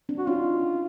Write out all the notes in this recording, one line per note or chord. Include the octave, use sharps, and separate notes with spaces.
C4 D4
F#4
C#4 D#4 F4